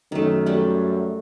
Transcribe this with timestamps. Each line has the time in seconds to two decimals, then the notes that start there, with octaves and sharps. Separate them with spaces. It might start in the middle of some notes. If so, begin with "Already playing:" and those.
0.12 F#2 D#3 A3
0.46 F#3 G3 A3